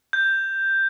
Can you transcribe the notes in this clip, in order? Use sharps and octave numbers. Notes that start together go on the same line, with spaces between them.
G6